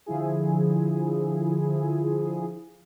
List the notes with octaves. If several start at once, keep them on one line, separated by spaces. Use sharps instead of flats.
D3 F3 E4 G#4